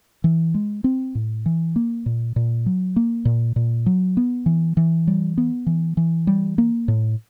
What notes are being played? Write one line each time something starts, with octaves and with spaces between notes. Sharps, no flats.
E3
G#3
C4
A2
E3
A#3
A#2
A#2
F#3
A#3
A#2
A#2
F#3
B3
E3
E3
G3
B3
E3
E3
G3
A#3
A2